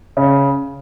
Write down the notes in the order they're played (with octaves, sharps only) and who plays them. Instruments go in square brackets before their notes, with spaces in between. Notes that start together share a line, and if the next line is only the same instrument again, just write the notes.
[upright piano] C#3